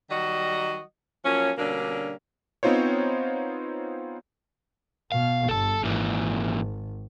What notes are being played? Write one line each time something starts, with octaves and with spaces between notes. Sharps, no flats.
D#3 F#3 G3 F#4 D#5
F3 F#3 A#3 C#4
B2 D3 G3 A#3 C#4 D4
B3 C4 D#4 F4 C5 C#5
B2 F5
G1 A4 A5
G#1 A#2 E3